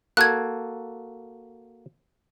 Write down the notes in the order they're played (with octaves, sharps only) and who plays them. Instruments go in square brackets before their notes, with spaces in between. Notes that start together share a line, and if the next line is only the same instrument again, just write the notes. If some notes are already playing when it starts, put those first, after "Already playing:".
[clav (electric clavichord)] A#3 F#4 A4 [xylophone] F#6 G#6